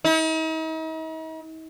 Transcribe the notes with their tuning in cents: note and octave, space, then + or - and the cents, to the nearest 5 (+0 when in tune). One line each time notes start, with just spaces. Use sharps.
D#4 +45